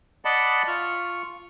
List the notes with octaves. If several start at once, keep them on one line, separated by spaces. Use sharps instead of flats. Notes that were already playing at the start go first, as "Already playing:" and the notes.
D5 D#5 F#5 A5 B5
F4 C#6 F6